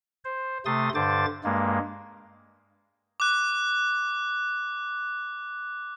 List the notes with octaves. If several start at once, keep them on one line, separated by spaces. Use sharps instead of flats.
C5
C3 A3 C6 D#6 A6
G2 D3 C5 D6 A6
G2 G#3 A#3
D6 F#6